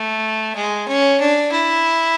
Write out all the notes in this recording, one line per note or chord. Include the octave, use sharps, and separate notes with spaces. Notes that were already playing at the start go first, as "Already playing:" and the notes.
Already playing: A3
G#3
C#4
D4
E4